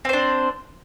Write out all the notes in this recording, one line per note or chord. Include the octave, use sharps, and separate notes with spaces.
C4 D4 C5